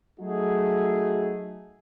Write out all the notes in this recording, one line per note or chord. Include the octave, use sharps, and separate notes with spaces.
F#3 A3 D#4 F#4 G#4